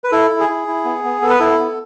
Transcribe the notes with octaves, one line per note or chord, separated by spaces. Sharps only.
B4
E4 A4
E4
G#4
E4
E4
B3
B3
B3 A4
B4
E4 A4
B3